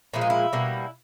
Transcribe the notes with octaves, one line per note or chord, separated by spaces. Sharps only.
A#2 F3 G#3 E4
D#4
E4
B2 G3 A#3